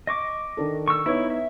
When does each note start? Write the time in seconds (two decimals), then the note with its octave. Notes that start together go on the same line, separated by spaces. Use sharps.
0.07 D#5 C#6 D6
0.57 D#3 D4 A4
0.88 C#6 E6
1.06 B3 D#4 E4 B4 C#5
1.30 E5